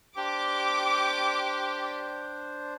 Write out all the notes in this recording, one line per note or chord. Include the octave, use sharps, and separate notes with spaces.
D4 G4 C5 D6